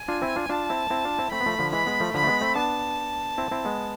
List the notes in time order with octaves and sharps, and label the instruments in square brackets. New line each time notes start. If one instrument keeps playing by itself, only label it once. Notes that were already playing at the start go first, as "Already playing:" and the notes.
Already playing: [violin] G#5
[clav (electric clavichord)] D4 F4
C4 E4
D4 F4
[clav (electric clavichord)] D4 F4 [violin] A5
[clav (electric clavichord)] C4 E4
C4 E4
D4 F4
C4 E4
[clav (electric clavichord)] A3 C4 [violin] B5
[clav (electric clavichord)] B3
F3 A3
D3 F3
[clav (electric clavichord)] E3 G#3 [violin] B5
[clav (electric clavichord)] G#3 B3
F3 A3
[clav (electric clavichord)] D3 F3 [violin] B5
[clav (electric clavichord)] A3
G#3 B3
A3 C4
[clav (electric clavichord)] B3 D4 [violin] A5
[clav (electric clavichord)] C4 E4
C4 E4
G#3 B3